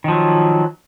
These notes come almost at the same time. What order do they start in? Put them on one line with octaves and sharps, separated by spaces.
D#3 F3 F#3